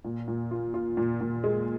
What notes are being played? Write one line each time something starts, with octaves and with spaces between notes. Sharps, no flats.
A#2
A#2
F4
F4
A#2
A#2
G#3